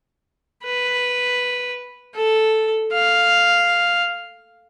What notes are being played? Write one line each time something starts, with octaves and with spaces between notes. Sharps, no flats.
B4
A4
F5